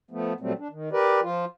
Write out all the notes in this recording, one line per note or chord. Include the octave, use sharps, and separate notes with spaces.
F3 A3 B3
A#2 F#3 G3 A3 C4
D4
D#3
G4 A#4 B4 D5
F3 F4